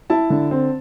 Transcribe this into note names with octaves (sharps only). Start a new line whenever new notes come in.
E4 A5
D3
C4